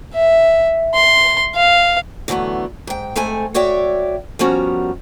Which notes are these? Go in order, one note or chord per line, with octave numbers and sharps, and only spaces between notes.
E5
C6
F5
D3 E3 F#3 A3 B3
G#2 G5
G#2 A3 C4 A4 G#5
F#4 C#5 D5 E5 G5
F3 G3 B3 C#4 F#4 A#4